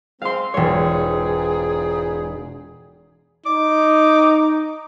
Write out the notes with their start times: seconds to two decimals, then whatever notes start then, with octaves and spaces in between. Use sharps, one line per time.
0.22 G#3 C4 F5 C6
0.54 E1 G#2 F4 G#4 C#5
3.46 D#4 D6